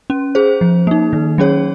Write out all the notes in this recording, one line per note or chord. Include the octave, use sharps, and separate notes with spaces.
C#4
G#4 C5
F3
A#3 D#4
D#3
F#3 C#4 G#4 C#5